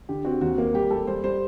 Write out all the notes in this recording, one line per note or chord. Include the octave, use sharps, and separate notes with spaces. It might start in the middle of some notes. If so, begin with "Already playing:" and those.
D3 G4
C4 F#4
D#2 F#4
A#3
G3 G4
G3 A4
G3 C5
G3 C5